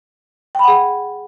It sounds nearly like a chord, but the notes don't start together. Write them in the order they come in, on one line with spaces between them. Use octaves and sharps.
G5 B5 F#5 G#4